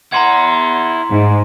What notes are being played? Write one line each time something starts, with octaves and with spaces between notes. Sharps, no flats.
E4 F#5 A#5 C6 G#6
G#2